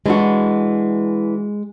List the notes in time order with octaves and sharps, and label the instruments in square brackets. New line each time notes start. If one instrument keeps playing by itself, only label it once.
[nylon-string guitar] E3 D4 F#4 [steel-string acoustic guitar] G#3